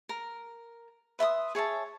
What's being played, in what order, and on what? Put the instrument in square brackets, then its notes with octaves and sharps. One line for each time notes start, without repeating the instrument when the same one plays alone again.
[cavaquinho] A#4
B4 E5 C6 D#6
G#4 C#5 E5 A5